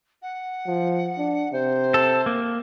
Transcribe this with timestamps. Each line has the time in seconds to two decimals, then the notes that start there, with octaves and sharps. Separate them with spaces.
0.22 F#5
0.67 F3
1.18 D4
1.53 C3 C5
1.94 A4
2.26 A#3